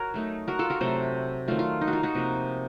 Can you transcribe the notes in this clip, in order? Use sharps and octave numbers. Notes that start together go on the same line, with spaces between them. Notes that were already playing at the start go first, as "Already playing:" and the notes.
Already playing: F#4 A#4 C#5
F#3 A3 D#4
F#4 A#4
F4 A4
F#4 A#4
C3 F#3 A3 A4 C5
D#3 F#3 A3 F4
F4
D#4
F#4
F4
D#4 F#4
C3 F3 A#3